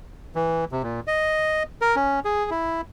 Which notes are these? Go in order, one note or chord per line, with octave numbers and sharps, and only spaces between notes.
E3
C3
A#2
D#5
A#4
C#4
G#4
E4